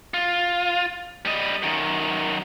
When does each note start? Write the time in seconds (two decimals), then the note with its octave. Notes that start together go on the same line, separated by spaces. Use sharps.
0.14 F4
1.25 G3 D#5
1.62 F#2 D#3